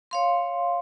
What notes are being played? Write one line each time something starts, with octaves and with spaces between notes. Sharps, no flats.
C#5 F5 C6